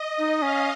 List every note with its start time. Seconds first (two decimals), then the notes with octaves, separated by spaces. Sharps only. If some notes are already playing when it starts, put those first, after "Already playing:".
Already playing: D#5
0.18 D#4
0.42 C#4 F5